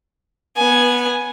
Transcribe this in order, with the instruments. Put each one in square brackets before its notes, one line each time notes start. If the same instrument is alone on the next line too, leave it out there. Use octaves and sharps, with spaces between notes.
[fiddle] B3 G#5